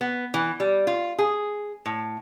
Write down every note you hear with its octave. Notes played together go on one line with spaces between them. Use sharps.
B3
E3
G3
F4
G#4
A2